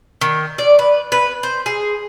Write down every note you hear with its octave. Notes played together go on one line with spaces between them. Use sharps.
D#3
D5
B4
B4
C5
G#4